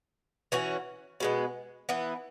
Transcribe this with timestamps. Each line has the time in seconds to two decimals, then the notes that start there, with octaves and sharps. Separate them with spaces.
0.52 E3 C#4 F#4
1.20 B2 G#3 B3
1.89 E3 B3 E4